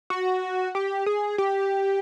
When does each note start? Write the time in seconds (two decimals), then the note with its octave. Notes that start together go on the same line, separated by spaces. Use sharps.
0.10 F#4
0.75 G4
1.06 G#4
1.38 G4